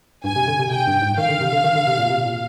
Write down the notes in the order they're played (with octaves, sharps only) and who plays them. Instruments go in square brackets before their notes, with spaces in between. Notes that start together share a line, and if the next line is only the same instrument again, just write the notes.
[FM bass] G2 [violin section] G#5
[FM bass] C3
D3
C3
[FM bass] C3 [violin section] G5
[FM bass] G2
G#2
[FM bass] D#3 [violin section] F5
[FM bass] D3
C3
D3
D#3
D3
C3
A#2
C3
A#2